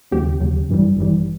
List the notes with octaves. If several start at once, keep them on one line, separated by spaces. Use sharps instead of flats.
D#2 C#3 F#3 G4
D#2 C#3 F#3
G#1 G2 E3 G3
G#1 G2 E3 G3